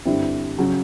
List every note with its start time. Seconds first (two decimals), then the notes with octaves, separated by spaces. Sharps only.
0.05 G2 D3 G3 C4 E4
0.59 C#3 F#3